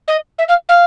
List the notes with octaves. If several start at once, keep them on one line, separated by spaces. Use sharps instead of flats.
D#5
E5
F5
F5